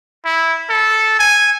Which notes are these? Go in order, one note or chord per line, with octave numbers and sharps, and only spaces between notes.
E4
A4
G#5